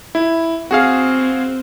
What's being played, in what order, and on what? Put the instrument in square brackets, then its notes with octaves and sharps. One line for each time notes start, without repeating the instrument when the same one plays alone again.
[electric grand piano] E4
[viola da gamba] C4 [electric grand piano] F#4 G#4 F5